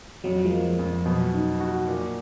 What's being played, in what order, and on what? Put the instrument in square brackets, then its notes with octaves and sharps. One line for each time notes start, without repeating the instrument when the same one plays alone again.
[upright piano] F2 [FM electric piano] F#3
[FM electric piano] F3 G#3
[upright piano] A#3
F2
[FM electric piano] F3
[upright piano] B2 [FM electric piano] F#3
[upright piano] D#4
F#4
A#2